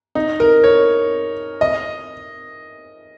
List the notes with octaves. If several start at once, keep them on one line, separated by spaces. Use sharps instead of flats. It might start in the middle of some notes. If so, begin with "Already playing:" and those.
D#4
A#4
C#5
D#5